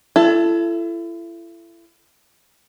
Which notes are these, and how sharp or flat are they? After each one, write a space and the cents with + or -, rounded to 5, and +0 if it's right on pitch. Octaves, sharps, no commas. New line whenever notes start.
E4 +35 A4 +0